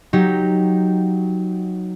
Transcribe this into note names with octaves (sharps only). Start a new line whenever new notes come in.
F#3 D#4 G4